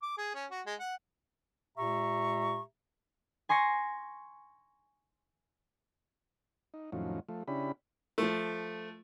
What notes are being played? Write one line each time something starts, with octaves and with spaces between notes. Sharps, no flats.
D6
G#4
C#4
F#4
G#3
F#5
A#2 G#3 G4 E5 A#5 C#6
G#5 C6 C#6 A#6
D#4
F2 A2 D#3 F3 F#3 C#4
F3 A3
C#3 C#4 D4 E4 G4 B5
F3 A3